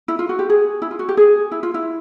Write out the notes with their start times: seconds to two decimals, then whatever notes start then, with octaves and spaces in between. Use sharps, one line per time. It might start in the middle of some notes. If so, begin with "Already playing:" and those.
0.08 E4
0.19 F4
0.29 F#4
0.39 G4
0.50 G#4
0.82 E4
0.91 F4
0.99 F#4
1.09 G4
1.17 G#4
1.52 E4
1.63 F4
1.74 E4